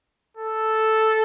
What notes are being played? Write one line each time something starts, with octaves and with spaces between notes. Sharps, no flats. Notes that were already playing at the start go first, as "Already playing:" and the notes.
A4